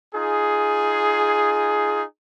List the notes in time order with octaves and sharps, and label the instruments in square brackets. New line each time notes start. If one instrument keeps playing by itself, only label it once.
[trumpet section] D#4 F4 G#4